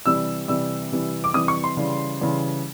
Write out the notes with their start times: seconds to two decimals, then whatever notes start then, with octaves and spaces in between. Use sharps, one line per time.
0.06 C3 E3 G3 E6
0.48 C3 E3 G3 E6
0.92 C3 E3 G3
1.24 D6
1.34 C3 E3 G3 D#6
1.48 C#6
1.64 C6
1.77 C#3 E3 G3
2.21 C#3 E3 G3